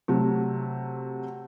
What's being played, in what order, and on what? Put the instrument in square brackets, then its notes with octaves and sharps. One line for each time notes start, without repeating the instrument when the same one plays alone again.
[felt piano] C3 F#3 A3